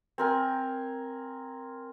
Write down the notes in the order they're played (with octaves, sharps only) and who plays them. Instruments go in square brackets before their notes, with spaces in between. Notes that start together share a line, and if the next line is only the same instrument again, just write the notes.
[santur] C4 A#4 G#5